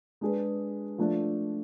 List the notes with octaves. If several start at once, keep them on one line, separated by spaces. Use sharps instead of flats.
G#3 D4 G#4 B4
F3 A3 D4